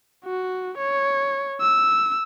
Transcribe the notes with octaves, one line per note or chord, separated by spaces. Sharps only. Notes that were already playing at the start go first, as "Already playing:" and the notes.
F#4
C#5
E6